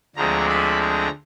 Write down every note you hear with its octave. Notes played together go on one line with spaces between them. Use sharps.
D2 D3 F3 G#3 C4 A#5
B5
A#5